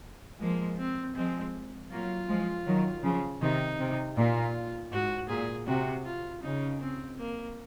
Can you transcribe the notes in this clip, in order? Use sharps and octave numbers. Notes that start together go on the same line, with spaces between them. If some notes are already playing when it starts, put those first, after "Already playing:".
F3 G#3 A#3
C4
F3 G#3 C4
F#3 A#3 F4
F3 G#3
D#3 F#3
C#3 F3
C3 D#3 D#4
C3
A#2 F4
G#2 F#4
A#2 G#4
C3 F#4
F4
C#3 D#4
C4
A#3